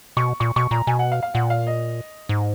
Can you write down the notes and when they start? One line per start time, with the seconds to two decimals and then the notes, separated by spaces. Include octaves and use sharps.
0.17 B2 C#6
0.40 A#2 C#6
0.56 B2 C#6
0.71 A#2 A#5
0.87 B2 G#5
0.99 F#5
1.12 F5
1.23 F5
1.34 A#2 F#5
1.50 F5
1.67 D#5
2.29 G#2